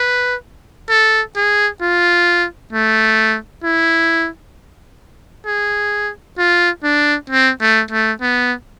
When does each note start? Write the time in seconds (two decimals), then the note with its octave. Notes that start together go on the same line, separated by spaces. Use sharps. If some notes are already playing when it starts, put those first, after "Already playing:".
Already playing: B4
0.89 A4
1.36 G#4
1.82 F4
2.73 A3
3.64 E4
5.46 G#4
6.38 F4
6.84 D4
7.30 C4
7.61 A3
7.91 A3
8.21 B3